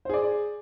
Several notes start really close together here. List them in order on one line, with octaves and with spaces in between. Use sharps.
C5 G#4 D5